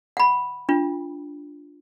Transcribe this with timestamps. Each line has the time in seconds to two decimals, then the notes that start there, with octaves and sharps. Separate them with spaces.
0.17 F#5 B5
0.69 D4 F4